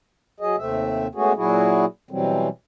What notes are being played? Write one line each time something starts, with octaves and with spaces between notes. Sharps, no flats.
F#3 G#4 D#5
D#2 C3 A3 C4 E5
G#3 A3 B3 C#4 F#4 G#4
A#2 F#3 E4 F#4 G#4
B2 E3 F#3 G3 C4